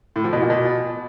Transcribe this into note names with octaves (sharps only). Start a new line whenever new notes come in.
A2
F3
B2
A#2
B2